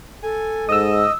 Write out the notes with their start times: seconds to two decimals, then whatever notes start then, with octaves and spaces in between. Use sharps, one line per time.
0.23 A4 G#5
0.69 G#2 D#5 D#6 E6